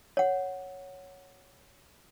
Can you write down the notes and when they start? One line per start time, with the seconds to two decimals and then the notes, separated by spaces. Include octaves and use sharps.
0.17 C#5 F#5